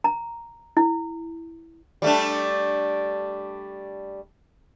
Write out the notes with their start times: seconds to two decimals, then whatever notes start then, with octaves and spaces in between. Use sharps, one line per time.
0.04 A#5
0.77 E4
2.02 G3 A3 D4